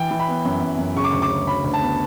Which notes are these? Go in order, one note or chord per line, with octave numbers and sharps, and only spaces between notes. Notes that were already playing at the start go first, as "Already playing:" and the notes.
Already playing: E3 G5
E3
B5
B3
F#2
F#2
F#2
C#3 C#6
D6
D2 C#6
D6
C#3
F#3 B5
D2
A5
B3